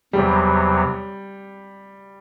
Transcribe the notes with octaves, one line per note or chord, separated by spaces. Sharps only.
E2 C3 F#3 G3